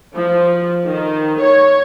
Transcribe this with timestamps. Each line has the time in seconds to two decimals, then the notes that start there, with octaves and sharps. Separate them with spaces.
0.16 F3
0.88 D#3
1.42 C#5